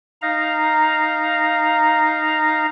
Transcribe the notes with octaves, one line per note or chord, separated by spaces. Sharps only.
D#4 F5 A#5